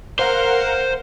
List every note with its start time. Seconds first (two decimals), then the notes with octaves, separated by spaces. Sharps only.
0.19 A#4 C5 F5 F#5